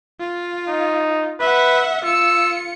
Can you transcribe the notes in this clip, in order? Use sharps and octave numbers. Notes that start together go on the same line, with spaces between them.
F4
D#4
B4 E5 F#5
F4 E6 C#7